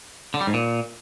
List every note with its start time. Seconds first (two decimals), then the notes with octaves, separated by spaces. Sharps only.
0.34 D3
0.41 G3
0.47 G#2
0.54 A#2